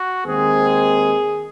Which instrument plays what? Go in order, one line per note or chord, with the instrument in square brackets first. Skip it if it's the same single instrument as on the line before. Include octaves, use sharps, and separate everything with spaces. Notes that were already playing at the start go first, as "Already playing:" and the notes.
Already playing: [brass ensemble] F#4
D#2 D#3 G#3 C4 G#4